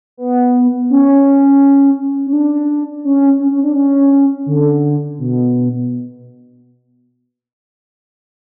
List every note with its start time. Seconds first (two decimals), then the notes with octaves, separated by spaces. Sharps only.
0.17 B3
0.90 C#4
2.27 C#4
2.33 D4
3.04 C#4
3.40 C#4
3.51 C#4
3.64 D4
3.76 C#4
4.46 D3
5.18 B2